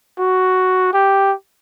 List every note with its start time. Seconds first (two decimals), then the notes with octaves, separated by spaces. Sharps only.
0.19 F#4
0.94 G4